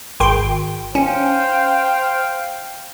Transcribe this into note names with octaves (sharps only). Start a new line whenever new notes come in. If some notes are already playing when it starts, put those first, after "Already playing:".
G#1 G5 C6
C#4 C5 F5 G5